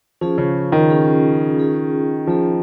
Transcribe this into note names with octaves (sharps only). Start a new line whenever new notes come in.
F3 C#4 F4 G#4
C#3
D#3
C#4 F4 G#4
C#4 F4 G#4
F3 C#4 F4 G#4